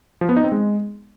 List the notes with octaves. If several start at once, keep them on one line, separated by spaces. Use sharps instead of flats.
F3
B3
D#4
C4
G#3